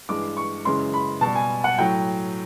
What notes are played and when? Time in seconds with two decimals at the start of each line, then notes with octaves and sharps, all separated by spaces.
0.09 G2 E3 G#3 D6
0.37 C#6
0.65 F#2 C#3 E3 G#3 C6
0.94 B5
1.21 B2 G3 A5
1.35 G#5
1.64 F#5
1.78 A2 F#3 G5